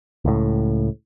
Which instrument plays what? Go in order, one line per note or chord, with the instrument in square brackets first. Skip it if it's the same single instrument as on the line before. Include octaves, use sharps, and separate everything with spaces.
[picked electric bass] C#2 A2